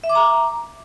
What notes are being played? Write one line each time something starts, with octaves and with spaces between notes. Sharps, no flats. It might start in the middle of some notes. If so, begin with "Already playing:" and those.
E5
D6
A#5